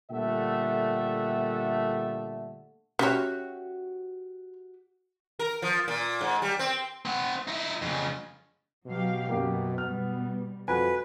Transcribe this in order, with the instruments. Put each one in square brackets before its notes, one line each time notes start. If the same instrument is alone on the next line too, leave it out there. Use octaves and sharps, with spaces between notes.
[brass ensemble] A#2 D3 G3 A3 E5 F#5
[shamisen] C#4 C#5 [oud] F#4 G4 E5
[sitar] A#4
F3
A#2
G#2
G3
C4
[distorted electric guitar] C4 F#5
D#4 E4
F2 C#3
[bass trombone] B2 [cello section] F#3 G4 F5
[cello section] F#2 [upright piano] A#3 G4 F5
[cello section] B2 G3 [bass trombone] B3 [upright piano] F6
[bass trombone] F2 [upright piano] F#4 G#5 [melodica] B4